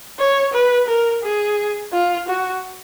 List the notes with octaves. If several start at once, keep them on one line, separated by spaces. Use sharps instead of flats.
C#5
B4
A#4
G#4
F4
F#4